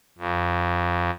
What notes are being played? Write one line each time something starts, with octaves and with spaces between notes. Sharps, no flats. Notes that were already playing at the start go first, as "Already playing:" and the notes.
F2